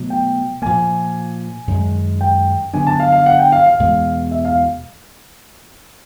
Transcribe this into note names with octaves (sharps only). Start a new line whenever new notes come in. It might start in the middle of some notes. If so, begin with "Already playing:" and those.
Already playing: B2 F#3 A3
G5
A#2 F3 A#3 G#5
F#2 D#3 G#3
G5
D3 F#3 B3 D4 G#5
A5
F5
F5
F#5
G5
F5
F5
E2 B2 G#3
E5
F5